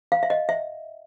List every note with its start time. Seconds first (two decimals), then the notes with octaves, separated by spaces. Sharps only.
0.12 F5
0.23 E5
0.30 D#5
0.49 E5